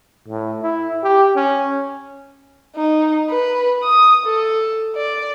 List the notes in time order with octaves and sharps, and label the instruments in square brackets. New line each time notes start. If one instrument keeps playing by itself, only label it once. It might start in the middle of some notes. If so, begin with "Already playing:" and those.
[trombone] A2
E4
G4
C#4
[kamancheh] D#4
B4
D#6
A4
D5